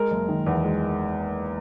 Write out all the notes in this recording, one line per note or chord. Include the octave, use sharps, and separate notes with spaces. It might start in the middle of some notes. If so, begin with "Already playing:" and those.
Already playing: G#3 A#4
F#1
D#3
E2
G#3